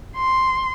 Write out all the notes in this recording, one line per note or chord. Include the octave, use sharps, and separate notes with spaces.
C6